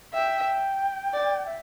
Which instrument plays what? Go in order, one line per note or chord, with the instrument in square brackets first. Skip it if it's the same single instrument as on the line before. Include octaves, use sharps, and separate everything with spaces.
[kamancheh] E5 [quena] G5
[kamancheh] D5
[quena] E5